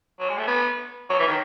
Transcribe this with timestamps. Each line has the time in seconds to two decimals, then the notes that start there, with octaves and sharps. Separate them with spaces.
0.20 F#3
0.29 G#3
0.38 A3
0.48 B3
1.10 F#3
1.19 E3
1.28 D#3